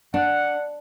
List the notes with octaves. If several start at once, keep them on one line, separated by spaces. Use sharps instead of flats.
D4 F#5